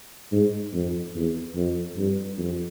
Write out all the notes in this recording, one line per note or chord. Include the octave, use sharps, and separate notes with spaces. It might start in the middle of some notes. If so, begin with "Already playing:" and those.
G#2
F2
E2
F2
G2
F2